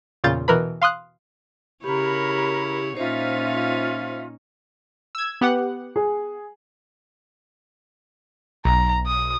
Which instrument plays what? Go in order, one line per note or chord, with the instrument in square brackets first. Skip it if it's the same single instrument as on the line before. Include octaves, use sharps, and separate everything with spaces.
[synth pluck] E2 A#2 C#3 F4 G6 A6
B2 E3 A#4 B4 B5
F5 C6 D#6 F#6
[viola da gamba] C#3 E4 C#5 [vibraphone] G4 [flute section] A#4 B5
[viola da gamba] A#2 C#4 D#4 [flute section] F4 E5 [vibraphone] C5
[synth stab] E6 G#6
B3 G4 F#5
[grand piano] G#4
[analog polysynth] B1 [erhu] A#5
[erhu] D#6